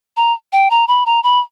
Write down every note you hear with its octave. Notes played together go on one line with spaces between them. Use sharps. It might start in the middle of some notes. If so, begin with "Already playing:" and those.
A#5
G5
A#5
B5
A#5
B5